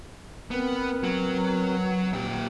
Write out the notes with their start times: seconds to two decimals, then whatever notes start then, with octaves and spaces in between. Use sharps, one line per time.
0.51 B3 C4 A#4 B4
1.04 F#3
2.13 A#2 G4